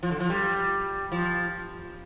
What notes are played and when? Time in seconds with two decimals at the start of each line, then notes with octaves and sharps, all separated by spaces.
0.03 F3
0.11 D3
0.20 F3
0.30 G3
1.12 F3